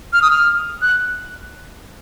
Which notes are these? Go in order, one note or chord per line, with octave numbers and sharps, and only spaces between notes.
F6
D#6
F6
F#6